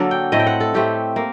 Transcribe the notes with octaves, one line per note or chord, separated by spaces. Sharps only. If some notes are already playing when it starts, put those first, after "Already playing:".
Already playing: D3 F#3 A#3 D4 A4
G5
A2 A3 C4 D#5
G5
F#5
A4
A2 A3 C4 G4
A#3